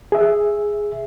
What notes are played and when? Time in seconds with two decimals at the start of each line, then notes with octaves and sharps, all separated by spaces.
0.12 G#4 E5